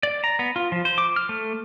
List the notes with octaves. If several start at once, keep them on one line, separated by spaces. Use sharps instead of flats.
D5
A#5
B3
F4
F3
C5
D6
F6
A3